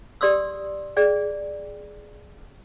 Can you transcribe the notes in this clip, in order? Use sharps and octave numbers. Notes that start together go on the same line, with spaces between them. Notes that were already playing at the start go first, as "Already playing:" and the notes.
G4 D5 C6 D#6 E6
G#4 D5 G5